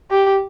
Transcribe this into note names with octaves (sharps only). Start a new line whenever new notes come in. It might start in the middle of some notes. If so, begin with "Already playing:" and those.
G4